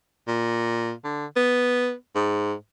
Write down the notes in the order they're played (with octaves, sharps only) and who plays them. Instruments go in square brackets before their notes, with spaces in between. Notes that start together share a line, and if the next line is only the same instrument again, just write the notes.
[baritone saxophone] A#2
D3
B3
G#2